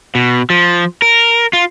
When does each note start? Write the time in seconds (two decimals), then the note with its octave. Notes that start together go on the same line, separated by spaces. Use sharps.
0.15 B2
0.50 F3
1.02 A#4
1.53 F4